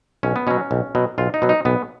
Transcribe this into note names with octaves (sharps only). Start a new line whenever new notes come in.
B1 C#4
B3
B2 F#3 C#4
B1
B2 F#3
B1 F4
D#4
B2 F#3
D#4
B1 B3